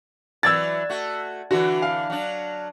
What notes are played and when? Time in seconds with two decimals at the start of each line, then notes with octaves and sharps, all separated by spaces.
0.43 E3 F#3 D5 E6 G#6 A6
0.90 A3 F#4
1.51 D3 E3 F#4
1.82 F5
2.10 F#3 D4